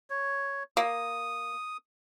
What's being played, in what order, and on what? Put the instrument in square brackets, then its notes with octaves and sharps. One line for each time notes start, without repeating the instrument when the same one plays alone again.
[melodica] C#5
[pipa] A#3 [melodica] D#6